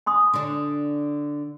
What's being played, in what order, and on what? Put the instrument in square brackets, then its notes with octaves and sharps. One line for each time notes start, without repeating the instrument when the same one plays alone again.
[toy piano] G#5 C6 D#6
[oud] D3 D4